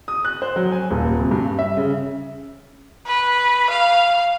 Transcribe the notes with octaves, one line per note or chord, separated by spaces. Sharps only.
D#6
F#6
C5
F#3
G#5
D#1
C3
G2
E5
C#3
B4
F5